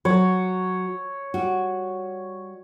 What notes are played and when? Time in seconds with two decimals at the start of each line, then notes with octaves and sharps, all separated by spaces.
0.05 F#3 C#5
1.34 G3 F#4